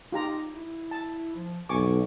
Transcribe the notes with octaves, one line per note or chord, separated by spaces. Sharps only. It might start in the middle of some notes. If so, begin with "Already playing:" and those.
D#4 F4 G4 A#5
E4
A5
F3
B1 F2 G#5 C#6 D6